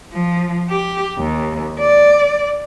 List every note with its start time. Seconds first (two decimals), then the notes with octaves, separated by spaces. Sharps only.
0.13 F3
0.70 G4
1.19 D#2
1.80 D5